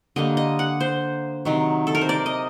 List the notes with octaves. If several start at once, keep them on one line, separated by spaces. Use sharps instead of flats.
D3 G3 A#3 D#5
D#5
F#5
C5
C3 D#3 F#3
A4
A#4
C5
D5
D#5